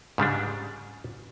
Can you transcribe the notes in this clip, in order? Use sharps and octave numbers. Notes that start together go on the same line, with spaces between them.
G#2 C#3 G3 D4